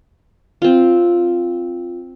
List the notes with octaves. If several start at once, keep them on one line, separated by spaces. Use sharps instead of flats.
C4 F4